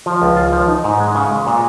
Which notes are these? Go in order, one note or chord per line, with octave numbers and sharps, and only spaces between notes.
F3
C#2
F4
F3
D#4
G#2
G#3
C#3
G#3
A#2